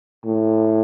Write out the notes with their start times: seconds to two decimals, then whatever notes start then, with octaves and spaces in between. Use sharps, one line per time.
0.25 A2